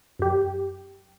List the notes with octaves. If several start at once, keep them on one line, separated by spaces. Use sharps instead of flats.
F#2 G4